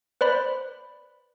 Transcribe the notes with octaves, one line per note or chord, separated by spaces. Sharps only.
B4 C5 D5 B5